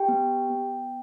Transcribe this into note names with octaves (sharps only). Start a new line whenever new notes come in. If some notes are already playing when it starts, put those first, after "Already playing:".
Already playing: G4 G5
B3
B3